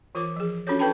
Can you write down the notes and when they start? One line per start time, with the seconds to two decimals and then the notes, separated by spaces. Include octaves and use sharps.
0.15 E3 F4 A#4 C5 D6
0.36 F3 G#4
0.67 C#4 D4 F4 F#4 A4 C#5
0.79 E4 A4 B4 G5 A5 B5